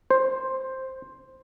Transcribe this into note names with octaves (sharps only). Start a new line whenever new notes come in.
C5